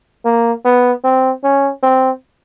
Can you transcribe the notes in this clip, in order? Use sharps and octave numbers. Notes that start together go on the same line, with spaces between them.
A#3
B3
C4
C#4
C4